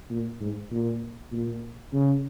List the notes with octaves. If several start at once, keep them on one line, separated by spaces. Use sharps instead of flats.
A#2
G#2
A#2
A#2
C#3